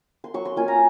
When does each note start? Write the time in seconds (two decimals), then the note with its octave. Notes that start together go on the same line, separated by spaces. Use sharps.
0.24 C6
0.34 F#3 C#6
0.45 C6
0.56 A#3 C#4 F4 G#5
0.68 A#5